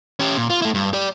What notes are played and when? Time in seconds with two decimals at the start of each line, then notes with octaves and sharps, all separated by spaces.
0.20 C#4 G4
0.37 A#2
0.50 F4
0.62 A3 E4
0.74 G2
0.93 G4 D5